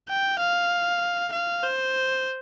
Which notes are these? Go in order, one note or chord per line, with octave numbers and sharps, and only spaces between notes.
G5
F5
F5
C5